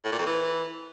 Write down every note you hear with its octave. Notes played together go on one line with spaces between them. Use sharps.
A2
A#2
F2
E3